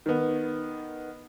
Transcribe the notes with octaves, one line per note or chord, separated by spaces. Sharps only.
D#3 B3